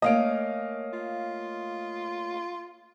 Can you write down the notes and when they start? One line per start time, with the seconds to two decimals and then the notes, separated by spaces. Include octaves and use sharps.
0.02 A3 A#3 C#4 D#5 F5 D7
0.93 F4